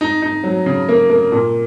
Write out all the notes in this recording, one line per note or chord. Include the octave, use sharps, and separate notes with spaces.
D#4
D#4
F#3
C#3
A#3
A#3
A#2